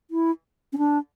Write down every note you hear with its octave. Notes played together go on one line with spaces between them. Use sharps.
E4
C#4
D4